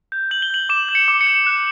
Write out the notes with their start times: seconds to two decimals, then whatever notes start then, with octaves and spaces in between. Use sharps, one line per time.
0.12 G6
0.31 G6 F#7
0.42 G7
0.50 G6 F#7
0.69 D6 E7
0.89 G6
0.95 C#7
1.08 D6
1.21 C#7
1.27 G6
1.46 F#6